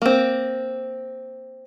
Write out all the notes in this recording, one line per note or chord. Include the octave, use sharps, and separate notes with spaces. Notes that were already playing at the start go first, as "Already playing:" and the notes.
A#3 C4